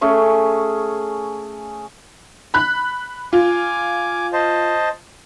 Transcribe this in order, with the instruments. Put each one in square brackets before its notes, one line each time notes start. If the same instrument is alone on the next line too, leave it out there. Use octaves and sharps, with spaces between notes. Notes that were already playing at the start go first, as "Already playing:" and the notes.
[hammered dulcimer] A3 C#4 G#4 C#5
[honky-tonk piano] B5 F#6
[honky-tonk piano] F4 [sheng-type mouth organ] G#5 D6
[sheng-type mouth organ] C5 D#5 A5